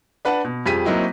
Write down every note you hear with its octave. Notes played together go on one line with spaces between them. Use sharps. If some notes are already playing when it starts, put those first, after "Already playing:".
D4 B4 F#5 A5
B2
F2 G3 G#4 B6 D#7
F#3 A#3 C4 D#4 E4 F#4